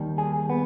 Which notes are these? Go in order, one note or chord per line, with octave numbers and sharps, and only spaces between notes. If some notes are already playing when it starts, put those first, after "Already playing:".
Already playing: D#2 D#3 G3
G#4
B3